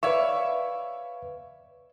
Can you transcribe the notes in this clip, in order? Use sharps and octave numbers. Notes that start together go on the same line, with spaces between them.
B4 C#5 D5 E5 F5 C#6